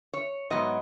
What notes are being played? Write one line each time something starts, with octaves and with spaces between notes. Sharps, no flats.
C#5
G#2 F#3 B3 D#5